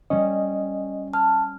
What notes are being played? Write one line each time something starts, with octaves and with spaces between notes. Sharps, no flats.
G3 C#4 D#5
A5 F6